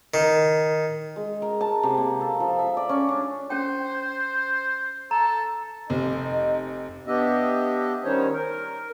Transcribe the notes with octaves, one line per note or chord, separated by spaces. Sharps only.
D#3
G#3
A#4
A5
C3
A#3
A4
F3
E5
D5
C#4
D4
C#4 C5 G5
A4 A#5
F1 C3 D#4
B3 D4 G4 D#5 E5
D#3 G3 C#4 D#4 C5 C#5
A#4